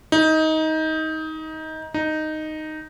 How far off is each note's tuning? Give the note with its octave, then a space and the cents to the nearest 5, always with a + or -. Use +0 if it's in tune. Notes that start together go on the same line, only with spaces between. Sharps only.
D#4 +20
D#4 -5